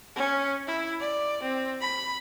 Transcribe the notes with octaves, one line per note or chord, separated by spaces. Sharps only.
C#4
E4
D5
C4
B5